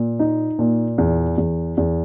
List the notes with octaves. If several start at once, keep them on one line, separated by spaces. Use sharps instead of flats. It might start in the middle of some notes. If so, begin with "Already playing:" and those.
Already playing: A#2
D#4
A#2
E2
E2
E2